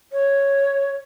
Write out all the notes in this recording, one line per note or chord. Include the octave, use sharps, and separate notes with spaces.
C#5